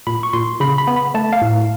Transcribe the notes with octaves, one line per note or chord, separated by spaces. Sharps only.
A#2 B5
C#6
A#2 C6
C#3 B5
B5
B3
B5
A3 A5
F5
A2